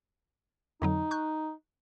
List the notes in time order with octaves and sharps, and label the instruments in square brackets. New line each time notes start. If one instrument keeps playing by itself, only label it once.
[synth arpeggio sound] F2 D3 F#3 [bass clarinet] D#4
[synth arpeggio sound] C#6 F#6 G6